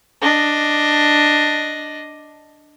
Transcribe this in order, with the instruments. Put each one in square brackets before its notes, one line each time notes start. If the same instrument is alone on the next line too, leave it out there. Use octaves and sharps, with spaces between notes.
[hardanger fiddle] D4 D#5